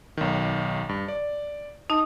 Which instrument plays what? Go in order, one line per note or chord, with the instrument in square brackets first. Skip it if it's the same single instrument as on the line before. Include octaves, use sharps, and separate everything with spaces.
[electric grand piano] B1 D#3
G2
D5
[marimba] D#4 D#5 A5